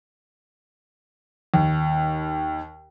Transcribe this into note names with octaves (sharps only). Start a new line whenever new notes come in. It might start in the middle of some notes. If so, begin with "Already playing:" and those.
D#2